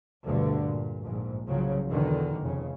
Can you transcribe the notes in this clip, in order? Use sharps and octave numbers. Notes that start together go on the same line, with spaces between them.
D2 G2 B2 D3
A#2
A#1 G#2
C2 C#3 F3 F#3
E2 B2 D3 D#3
F1 C#3